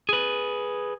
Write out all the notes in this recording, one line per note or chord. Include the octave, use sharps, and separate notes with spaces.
G#4 B4